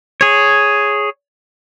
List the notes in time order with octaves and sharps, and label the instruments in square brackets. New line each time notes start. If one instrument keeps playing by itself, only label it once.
[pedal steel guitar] G#4 C#5